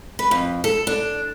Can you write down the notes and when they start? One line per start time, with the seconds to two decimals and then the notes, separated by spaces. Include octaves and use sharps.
0.19 B4
0.31 F2
0.64 A4
0.87 D4